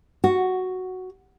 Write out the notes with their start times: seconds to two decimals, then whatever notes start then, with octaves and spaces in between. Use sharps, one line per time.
0.24 F#4